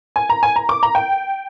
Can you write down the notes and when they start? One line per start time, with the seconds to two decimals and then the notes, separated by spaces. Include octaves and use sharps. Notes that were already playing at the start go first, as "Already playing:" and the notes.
0.16 G#5
0.29 A#5
0.43 G#5
0.56 A#5
0.69 D6
0.83 A#5
0.95 G5